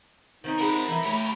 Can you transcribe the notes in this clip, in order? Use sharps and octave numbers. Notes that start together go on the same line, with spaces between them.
D#3 C4 C#4 D#4
F3 G#3 C4 A#4 F#5 B5
E3 D#4 E4
A3 G4 A#4 C#5